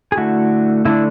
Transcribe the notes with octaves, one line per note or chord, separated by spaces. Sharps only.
G#4
D3 A3 E4 F#4
D3 A3 D4 E4